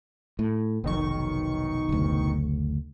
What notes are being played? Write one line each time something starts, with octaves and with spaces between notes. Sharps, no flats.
A2
F1 B1 D#3 C#6
F#1 D2